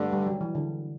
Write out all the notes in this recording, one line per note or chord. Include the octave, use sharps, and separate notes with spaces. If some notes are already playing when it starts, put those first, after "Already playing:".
Already playing: G2 D3 A3
G3
F#3
E3
D3